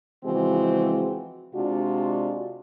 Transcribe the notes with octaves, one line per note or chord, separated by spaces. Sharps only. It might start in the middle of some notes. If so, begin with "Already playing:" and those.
C#3 E3 F3 G#3 C4 F#4
C3 G#3 D4 F4 F#4